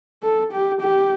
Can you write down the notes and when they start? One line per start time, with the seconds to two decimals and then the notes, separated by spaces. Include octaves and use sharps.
0.23 A4
0.52 G4
0.81 G4